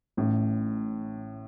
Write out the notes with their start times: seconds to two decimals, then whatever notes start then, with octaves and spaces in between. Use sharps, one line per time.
0.17 A1 A2